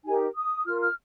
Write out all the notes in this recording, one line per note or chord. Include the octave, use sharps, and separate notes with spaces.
D#4 G4 A#4 G#5
D#6
F4 A#4 F6
F6